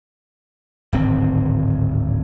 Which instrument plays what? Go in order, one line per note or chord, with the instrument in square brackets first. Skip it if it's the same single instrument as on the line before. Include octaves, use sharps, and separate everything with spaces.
[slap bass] D1 G#1 C4